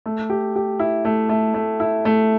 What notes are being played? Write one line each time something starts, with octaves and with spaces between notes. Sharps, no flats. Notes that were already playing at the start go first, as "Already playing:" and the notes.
A3
G4
G4
E4
A3
A3
A3
E4
A3